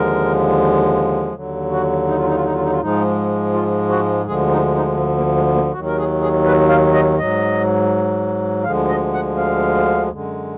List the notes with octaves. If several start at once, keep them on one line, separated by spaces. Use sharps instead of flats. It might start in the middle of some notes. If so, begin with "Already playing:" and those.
Already playing: D#2 D3 F3 G#3 A#4
D#2 D3 F#3
F#4
D#4
F4
D#4
F4
D#4
F4
D#4
F4
G#2 F3 G#3 D#4
F4
F#4
D2 D3 F3 G#3 G#4
D#4
D#4
G#3
A#3
G#3
A#3
D#2 D#3 F#3 F#4
A#4
G#4
G#4
B4
F5
D#5
G#2 F#3 D#5
D2 D3 F3 G#3 F5
D#5
F#5
F5
F#2 D3 G#3